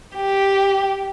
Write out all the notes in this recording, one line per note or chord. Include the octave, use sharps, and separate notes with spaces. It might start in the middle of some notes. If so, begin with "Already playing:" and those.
G4